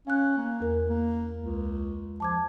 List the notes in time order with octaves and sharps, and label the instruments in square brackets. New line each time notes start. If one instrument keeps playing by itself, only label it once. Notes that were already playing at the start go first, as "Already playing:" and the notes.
[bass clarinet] C#4 [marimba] F5 F#6
[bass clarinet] A#3
[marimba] E2 A#4
[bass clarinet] A#3
C#2
[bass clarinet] F3 [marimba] A5 D6 G#6